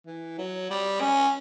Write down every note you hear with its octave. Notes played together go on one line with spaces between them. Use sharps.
E3
F#3
G3
C#4